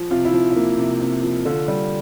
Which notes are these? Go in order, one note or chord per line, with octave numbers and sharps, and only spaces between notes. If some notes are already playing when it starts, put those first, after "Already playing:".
Already playing: F3
C3 F4
E4
F3
E4
A#3
C3
C3
F3
D3 F4
G3